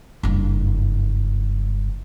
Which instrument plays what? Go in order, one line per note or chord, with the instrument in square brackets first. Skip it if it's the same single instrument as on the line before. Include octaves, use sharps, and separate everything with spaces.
[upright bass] F#1 G2